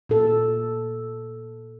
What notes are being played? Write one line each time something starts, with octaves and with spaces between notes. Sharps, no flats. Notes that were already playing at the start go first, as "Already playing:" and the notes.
A#2 A4